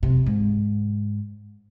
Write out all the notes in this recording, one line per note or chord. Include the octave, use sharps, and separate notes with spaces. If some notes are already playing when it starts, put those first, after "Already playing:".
C3
G#2